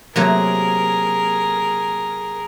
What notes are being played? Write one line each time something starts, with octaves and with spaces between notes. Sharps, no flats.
C3 F#3 A#3 G#4 A#4